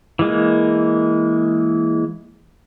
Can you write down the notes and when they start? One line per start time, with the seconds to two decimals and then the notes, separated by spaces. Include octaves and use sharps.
0.19 E3 G#3 A#3